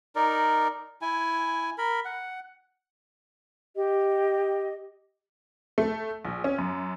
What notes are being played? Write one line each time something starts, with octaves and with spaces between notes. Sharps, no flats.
D#4 A#4 D5
E4 G#5
A#4 B5
F#5
G4 D#5
A3
A#1
C#4
F#2